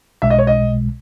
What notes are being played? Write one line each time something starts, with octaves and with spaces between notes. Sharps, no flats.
B1 B2 G#3 E5
D#5
C#5
D#5